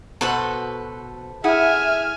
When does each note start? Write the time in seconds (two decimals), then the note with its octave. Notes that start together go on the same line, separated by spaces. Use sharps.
0.21 B2 F#4 A4 B4 C5 D#5
1.44 E4 G#4 E5 F#5 G#5 F6